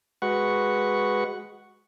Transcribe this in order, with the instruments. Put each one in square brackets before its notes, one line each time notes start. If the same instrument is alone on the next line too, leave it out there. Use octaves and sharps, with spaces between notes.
[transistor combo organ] G#3 F#4 B4 F#5 C#6